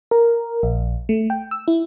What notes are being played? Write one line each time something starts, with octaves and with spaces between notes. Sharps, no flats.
A#4
A#1
A3
G5
E6
E4